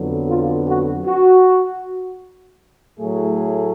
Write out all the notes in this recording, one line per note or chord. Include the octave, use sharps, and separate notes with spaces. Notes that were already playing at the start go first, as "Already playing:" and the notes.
Already playing: F2 D3 F#3 B3
F4
F#4
F#4
A2 F#3 A3 G#4